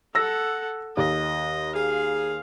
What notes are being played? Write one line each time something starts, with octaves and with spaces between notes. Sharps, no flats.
A4 F#5 E6 A#6
D#2 D#5
G#4 F5